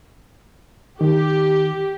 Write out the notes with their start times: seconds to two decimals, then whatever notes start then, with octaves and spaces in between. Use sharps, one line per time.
1.01 D#3 G4